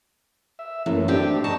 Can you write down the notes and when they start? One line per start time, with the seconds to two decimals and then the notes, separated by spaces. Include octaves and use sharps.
0.59 E5
0.86 F#2 E3 A3 A#3
1.08 A2 C4 D4 G4
1.44 D#5 A5 A#5 C#6